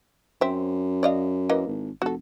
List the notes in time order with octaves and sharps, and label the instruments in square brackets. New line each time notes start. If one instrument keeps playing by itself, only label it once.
[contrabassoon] F#2 [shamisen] C4 E5
[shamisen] D5 D#5 F5
E3 A#3 D#5
[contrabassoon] G#1
[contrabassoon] F1 [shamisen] F#4 A4